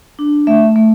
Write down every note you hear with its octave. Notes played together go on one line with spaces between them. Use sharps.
D4
A3 E5
A3